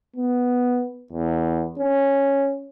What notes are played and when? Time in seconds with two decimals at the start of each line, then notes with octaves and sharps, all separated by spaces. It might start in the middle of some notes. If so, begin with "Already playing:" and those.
0.16 B3
1.12 E2
1.79 C#4